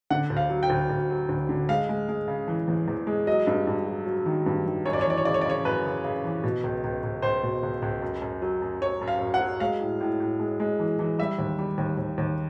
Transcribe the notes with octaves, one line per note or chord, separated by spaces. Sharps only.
D3 F#5
D2
F5
F#3
G5
D2
D2
F#3
D2
D3
G#3 F5
G#3
G#3
C#3
E3
E2
E2
G#3
F#3 D#5
G2
G2
F#3
F#3
D#3
G2
D#3
F#2 C#5
D5
C#5
E3 D5
C#5
C#3 D5
C#5
D5
C#3 C#5
F#2 B4
C#3
C#3
E3
B2
C#2
C#2
C#2
C#2 C5
B2
C#2
C#2
F#2
F#2
F#3
F#2
F#3 C#5
F#2
F5
F#2
F#5
F#3
G#3 F5
A2
A2
A2
G#3
G#3
E3
E3
G3 E5
D#2
G3
D#2
D#2
D#2